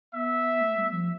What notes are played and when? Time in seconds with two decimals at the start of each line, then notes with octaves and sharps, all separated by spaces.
0.14 B3 E5
0.61 A3
0.77 G3
0.92 F3